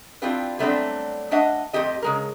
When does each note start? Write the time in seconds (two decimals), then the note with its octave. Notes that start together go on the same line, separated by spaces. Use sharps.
0.22 C4 D4 E4 F4 G4 B4
0.59 F#3 G3 A3 B3 C4 D4
1.31 A3 D4 D#5 E5 F#5
1.73 F2 A3 C4 G4 D#5
2.02 C#3 G#3 A#4